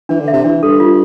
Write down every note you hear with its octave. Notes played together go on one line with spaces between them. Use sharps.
E3 D4
D3
E5
C3
E3 D4
G2 A4
F4